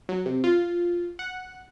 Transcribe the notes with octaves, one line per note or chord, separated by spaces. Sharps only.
F#3
C3
F4
F#5